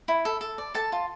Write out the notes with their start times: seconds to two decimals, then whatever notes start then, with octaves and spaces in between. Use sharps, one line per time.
0.08 E4
0.25 A4
0.41 A4
0.58 D5
0.74 A4 A5
0.92 F4